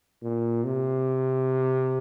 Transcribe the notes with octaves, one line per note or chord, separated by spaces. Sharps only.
A#2
C3